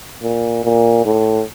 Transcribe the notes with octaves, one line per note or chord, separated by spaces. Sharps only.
A#2
A#2
A2